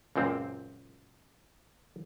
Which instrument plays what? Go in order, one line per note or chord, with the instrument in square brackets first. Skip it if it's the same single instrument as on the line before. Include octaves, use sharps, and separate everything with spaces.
[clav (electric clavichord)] C#2 F#2 A#2 C4